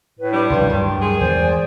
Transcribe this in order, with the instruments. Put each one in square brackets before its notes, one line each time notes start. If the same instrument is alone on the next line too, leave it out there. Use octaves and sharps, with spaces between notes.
[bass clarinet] A2 [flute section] B4
[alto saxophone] G3 [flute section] D4 B5
[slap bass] C2 C#3 F3 [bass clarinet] G2 [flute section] C6
[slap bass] D2 G2 F#3 [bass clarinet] D#3
[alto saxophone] G#4
[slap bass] E2 E3 G#3 [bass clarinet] C5 [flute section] D5 G5 G#5